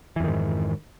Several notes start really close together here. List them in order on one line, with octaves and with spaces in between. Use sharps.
E3 F2 D#3 G#2